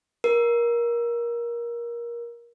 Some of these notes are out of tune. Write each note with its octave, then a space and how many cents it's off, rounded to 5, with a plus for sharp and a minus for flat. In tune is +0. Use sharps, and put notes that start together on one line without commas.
A#4 +20